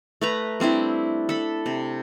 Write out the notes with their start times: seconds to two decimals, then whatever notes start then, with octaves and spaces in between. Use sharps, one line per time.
0.21 A3 B4 A#5
0.60 G3 C4 D4 E4
1.29 A4 B5
1.66 C3